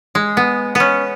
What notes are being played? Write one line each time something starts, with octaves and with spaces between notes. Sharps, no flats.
G#3
B3
B3 C#4